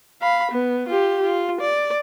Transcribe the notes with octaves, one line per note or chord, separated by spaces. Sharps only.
F5 B5
B3
F4 G4
F4
D5